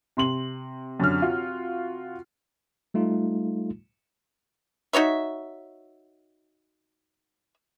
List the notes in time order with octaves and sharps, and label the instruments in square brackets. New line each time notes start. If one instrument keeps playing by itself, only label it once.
[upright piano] C3 C6 F#7
[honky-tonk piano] F#2 D3 F6
F4 F#4
[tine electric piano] G3 A3 D#4 F4
[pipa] D#4 F#4 C#5 E5